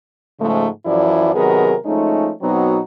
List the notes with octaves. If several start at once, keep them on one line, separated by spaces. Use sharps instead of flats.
G#2 C#3 F3 G#3 A3
F#2 E3 F3 E4 D5
C3 D#3 F#3 B3 G#4 A#4
F3 G#3 A3 C#4 D#4
B2 F#3 B3 C4 D#4 F#4